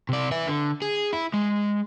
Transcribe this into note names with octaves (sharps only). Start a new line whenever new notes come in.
C3 D5
B4 E5
D3
G#4
E4
G#3